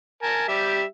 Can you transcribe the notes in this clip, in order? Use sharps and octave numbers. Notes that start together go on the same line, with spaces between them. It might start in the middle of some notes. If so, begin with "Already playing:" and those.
A#4 G#5 A5
G3 G4 E5